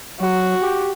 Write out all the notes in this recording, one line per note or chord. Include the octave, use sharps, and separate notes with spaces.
F#3 F#4
G4